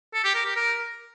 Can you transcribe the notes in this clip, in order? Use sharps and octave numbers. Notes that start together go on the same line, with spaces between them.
A4
G4
A#4
G4
A#4